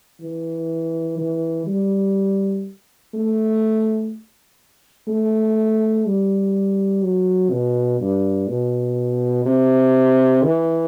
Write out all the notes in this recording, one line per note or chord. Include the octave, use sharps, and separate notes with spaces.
E3
E3
G3
A3
A3
G3
F#3
B2
G2
B2
C3
E3